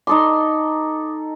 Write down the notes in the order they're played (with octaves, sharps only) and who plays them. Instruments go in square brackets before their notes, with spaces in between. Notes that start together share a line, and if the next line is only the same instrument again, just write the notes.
[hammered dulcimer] D#4 A4 C6 [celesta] D6 D#6